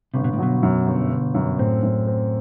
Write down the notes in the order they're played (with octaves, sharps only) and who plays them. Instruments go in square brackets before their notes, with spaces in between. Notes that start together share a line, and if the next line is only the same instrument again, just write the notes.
[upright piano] G1 [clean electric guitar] C3
[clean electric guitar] B2
A2
[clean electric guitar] B2 [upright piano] F#3
[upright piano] F#2
G1
G1
F#2
[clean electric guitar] A2 [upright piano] C4
[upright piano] F#2
C4